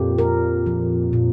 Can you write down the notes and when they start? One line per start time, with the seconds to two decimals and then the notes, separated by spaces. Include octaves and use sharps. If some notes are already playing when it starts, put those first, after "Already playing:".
Already playing: F2 A#2 G4
0.18 A#4
0.67 F3
1.13 A#2